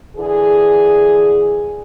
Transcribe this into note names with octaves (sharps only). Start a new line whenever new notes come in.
D3 E3 G#4